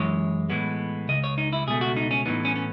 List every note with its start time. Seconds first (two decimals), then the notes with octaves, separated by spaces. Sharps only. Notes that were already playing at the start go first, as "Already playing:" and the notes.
Already playing: F#2 E3 G#3 C#5
0.50 A2 E3 G#3 B3
1.08 C#2 C#3 D#5
1.24 C#5
1.38 D#4
1.53 E4
1.67 C#2 B2 A3 G#4
1.81 F#4
1.97 D#4
2.11 C#4
2.26 A2 E3 B3 D#4
2.45 C#4
2.56 C#4